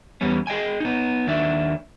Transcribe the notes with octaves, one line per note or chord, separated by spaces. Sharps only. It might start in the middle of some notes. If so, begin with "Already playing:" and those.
E2 G3 B3 C#4
G#4 D#5 G5 G#5
B3 D#4
D#2 D#3 D4 E5